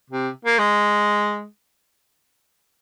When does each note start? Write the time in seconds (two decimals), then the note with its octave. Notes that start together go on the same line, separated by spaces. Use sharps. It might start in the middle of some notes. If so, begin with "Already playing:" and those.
0.10 C3
0.45 A#3
0.58 G#3